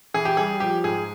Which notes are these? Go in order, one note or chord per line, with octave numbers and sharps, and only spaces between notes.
E3 G#4
G4
G3 G#4
F3 G4
G#2 G#4